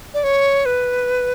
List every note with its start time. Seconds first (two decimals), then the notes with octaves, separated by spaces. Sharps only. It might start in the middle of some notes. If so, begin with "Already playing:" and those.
0.14 D5
0.24 C#5
0.66 B4